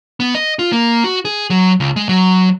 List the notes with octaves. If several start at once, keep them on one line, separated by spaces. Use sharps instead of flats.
B3
D#5
F4
A#3
F#4
G#4
F#3
C#2
G#3
F#3